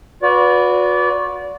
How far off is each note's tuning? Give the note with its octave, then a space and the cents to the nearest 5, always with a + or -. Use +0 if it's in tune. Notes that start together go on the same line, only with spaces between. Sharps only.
F#4 -35 B4 +0 D5 -30